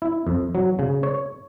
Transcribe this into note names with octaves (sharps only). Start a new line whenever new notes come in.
E4
F2
F#3
C#3
C#5